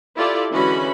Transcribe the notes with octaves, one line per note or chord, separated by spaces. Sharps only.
E4 F4 G4 A4 D5
D3 E3 G#3 C#4 F#4 B5